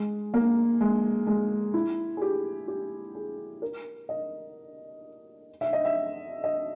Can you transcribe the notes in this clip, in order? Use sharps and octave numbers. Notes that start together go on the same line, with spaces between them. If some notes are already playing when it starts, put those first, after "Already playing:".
Already playing: G#3
A#3
G#3
G#3
E4
G#4
G4
G4
G#4
A#4
D#5
E5
D#5
E5
D#5